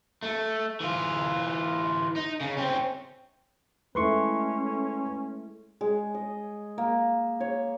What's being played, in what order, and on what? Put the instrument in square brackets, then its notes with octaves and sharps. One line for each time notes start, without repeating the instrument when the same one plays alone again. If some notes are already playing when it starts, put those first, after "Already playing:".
[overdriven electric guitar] A3
E3 F4
D#4
C#3
C4 C#4
[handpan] G#3 A3 E4 [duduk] C#4 [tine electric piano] B4 C6 C#6
[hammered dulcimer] G#3
D#5
A#3
C#5